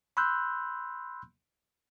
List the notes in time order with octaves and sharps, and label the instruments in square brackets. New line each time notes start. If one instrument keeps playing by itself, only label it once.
[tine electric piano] B5 C6 E6 F#6 G6